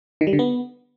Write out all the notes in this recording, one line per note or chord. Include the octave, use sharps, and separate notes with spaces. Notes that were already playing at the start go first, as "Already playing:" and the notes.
D#3
G3
D3
B3